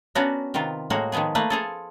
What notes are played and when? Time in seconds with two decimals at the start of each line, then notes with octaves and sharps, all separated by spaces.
0.15 B3 C#4 D4 F#4 A#4
0.54 C3 D#3 B3 F4
0.90 A2 G#3 A#3 F#4 F5
1.12 D#3 F3 G#3 B3 G#4
1.35 A3 A#3 B4
1.50 F4 G#4 A4